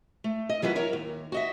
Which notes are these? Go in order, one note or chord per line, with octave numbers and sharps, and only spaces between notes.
A3
D#5
E3 F#3 F4 A4 B4
E4 A#4 C#5
D#2
F#4 D#5 E5